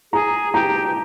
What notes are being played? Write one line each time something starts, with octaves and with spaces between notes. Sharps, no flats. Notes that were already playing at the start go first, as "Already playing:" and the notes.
G#4 A#5
G4 A#5